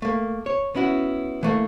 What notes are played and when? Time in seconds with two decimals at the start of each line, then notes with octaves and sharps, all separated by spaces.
0.02 A3 A#3
0.46 C#5
0.75 B3 C#4 E4 F#4
1.43 E3 A3 A#3